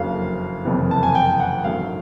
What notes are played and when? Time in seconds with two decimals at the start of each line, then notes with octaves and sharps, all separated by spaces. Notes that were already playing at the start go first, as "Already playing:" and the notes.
Already playing: F#1 F2 D3 F#3 A#3 F5
0.65 F#1 F2 C3 E3
0.91 A5
1.03 G#5
1.15 G5
1.40 F#5
1.64 G#1 F#2 D3 F#3 F5